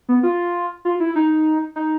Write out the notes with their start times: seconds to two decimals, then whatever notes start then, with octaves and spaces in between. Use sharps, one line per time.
0.09 B3
0.23 F4
0.85 F4
1.00 E4
1.16 D#4
1.76 D#4